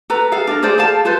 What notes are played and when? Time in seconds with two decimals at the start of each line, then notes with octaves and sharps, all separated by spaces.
0.10 A4 B4 A#5
0.32 G#4 A4 F5
0.47 D4 A4 A#4
0.63 G#4 A4 C5 D5
0.78 G#4 A4 F5 A5
1.05 F4 A4 B4 C5